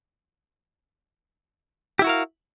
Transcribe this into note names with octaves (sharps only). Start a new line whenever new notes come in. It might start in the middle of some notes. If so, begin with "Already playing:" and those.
E4 F#4 G4 A#4 F5